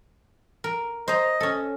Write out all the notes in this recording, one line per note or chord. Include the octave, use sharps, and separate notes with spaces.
A#4
C5 D#5 A#5
C#4 A4